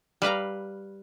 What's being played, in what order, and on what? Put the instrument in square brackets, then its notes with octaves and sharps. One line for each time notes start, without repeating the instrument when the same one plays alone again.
[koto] G3 B4 F5 A#5